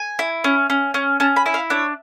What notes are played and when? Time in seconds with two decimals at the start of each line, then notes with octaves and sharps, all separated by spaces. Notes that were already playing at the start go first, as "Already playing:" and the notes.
Already playing: G#5
0.19 E4
0.44 C#4
0.70 C#4
0.94 C#4
1.20 C#4 A5
1.36 B5
1.46 E4
1.54 F5
1.70 D4 C#5